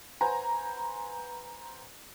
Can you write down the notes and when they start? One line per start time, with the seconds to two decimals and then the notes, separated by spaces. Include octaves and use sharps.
0.21 B4 C5 F#5 G#5 A#5